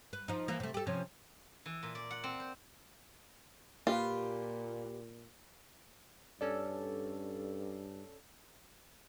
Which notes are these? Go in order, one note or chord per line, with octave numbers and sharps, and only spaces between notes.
B4
F3 D#4
E3 A#3
C3 A3
G4 A4
C3 F3 C#4
E3
A#2
D5
F#5
C4
C5
A#2 A#3 F4 G4 B4
G2 C#4 A4 D5